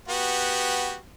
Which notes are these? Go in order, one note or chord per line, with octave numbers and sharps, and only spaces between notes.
B3 F#4 G4